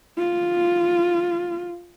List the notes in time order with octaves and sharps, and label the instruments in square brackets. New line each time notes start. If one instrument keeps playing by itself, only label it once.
[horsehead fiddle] F4